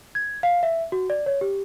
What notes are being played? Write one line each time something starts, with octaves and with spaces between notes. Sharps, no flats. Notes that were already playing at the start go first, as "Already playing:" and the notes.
G#6
F5
E5
F#4
D5
C#5
G4